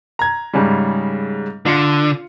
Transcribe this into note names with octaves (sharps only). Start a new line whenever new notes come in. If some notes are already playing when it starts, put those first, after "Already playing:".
A#5 G#6
G#2 C#3 G3
D3 F4 C6 C#7